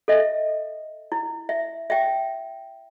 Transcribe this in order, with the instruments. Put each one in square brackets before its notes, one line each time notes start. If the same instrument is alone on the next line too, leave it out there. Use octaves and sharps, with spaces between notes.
[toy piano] A4 D#5 E5
E4
E5
E5 G5